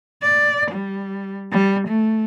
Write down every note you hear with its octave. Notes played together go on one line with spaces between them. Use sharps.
D5
G3
G3
A3